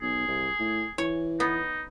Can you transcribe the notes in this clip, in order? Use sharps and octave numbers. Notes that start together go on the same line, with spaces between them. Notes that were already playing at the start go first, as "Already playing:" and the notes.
B1 G#4
C2
A2
E3 C#5
B3 D#4